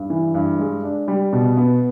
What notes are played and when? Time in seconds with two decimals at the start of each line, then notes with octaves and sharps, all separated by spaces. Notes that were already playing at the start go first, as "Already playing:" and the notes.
Already playing: G2
0.10 E3
0.34 G2
0.59 G#3
0.83 D4
1.08 G3
1.33 B2
1.57 B3